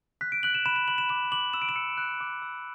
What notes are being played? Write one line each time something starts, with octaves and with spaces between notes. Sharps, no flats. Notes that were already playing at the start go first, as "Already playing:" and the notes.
F#6 B6
D7
F#6 F#7
E7
B5 E7
E7
B5 F#7
E7
D6 E7
D6 F#7
E6 E7
D7
E7
E6 C#7
F#6
D6
E6